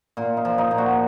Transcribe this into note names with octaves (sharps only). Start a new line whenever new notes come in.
A#2 F4
D#4
F3
D#4
A#2
F#4